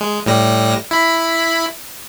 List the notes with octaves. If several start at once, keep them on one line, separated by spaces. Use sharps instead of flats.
G#3
A2 G3 A#6
E4 B5